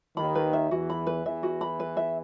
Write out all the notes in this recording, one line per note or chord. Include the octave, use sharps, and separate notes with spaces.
D#2 D#3 B5
B4
E5
E2 E3 F#4
B5
B4
E2 E3 E5
F#4
B5
B4
E5